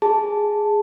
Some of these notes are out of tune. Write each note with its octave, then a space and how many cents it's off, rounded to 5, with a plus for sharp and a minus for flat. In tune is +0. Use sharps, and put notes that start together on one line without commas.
G#4 +0 A5 +0